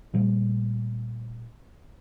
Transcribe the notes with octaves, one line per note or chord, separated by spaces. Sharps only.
A#2 G3 A3